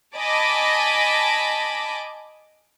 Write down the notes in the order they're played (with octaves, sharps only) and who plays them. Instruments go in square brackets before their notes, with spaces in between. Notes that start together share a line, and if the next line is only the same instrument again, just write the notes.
[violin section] D#5 G#5 A5 B5 D6